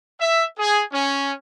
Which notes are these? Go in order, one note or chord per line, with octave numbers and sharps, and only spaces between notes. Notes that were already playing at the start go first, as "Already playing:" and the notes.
E5
G#4
C#4